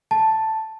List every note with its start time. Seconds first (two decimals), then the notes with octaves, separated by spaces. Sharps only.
0.11 A5